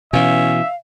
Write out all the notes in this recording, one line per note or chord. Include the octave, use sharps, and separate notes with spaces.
B2 E3 C#4 E5 F5